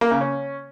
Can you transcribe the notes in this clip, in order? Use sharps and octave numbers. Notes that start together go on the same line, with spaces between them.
A#3
C#3
C#4